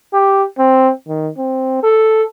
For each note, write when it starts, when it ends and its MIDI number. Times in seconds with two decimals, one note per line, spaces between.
0.13 0.43 67
0.58 0.91 60
1.08 1.29 51
1.38 1.78 60
1.83 2.23 69